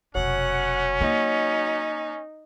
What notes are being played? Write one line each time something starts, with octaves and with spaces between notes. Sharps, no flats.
F1 B2 F#3 C#4 F#5
A#3 D#4